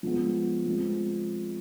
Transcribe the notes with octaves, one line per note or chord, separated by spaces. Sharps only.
F3 G#3 B3
F3 G#3 C4